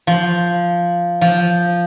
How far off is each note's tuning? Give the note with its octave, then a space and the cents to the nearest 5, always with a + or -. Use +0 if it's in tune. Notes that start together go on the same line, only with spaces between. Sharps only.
F3 -5
F3 -5